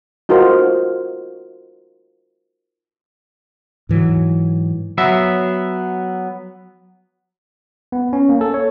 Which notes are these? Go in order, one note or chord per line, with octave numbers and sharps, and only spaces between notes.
D#4 F4 F#4 A#4 C5
G#2 E3 F#3
F#3 B3 E5
B3
C#4
A#3
A4
C#5